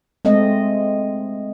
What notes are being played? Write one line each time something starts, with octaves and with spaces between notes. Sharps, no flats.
G#3 A3 C4 D#5